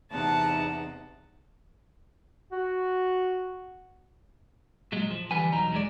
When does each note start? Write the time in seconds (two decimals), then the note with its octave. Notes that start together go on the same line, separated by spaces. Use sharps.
0.11 E2 C3 D#4 F#5 A5
2.52 F#4
4.92 A#2 F#3 G#3
5.11 F3
5.31 D3 E3 G3 B4 F#5 G#5
5.53 B1 E2 F#3 D#4 A#5
5.72 G#3 A3 G#4 D5